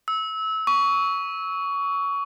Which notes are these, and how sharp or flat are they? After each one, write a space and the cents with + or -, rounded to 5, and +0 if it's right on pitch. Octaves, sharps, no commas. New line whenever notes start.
E6 -25
C#6 +20